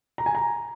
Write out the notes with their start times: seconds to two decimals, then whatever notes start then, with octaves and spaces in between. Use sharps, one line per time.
0.18 A#5
0.26 G#5
0.35 A#5